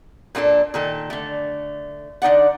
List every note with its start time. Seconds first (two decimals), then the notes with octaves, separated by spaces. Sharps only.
0.35 A#2 A#3 D4 A4
0.74 A#2 D#3 A4
1.10 D3 A3
2.22 D3 D#4 D5 F#5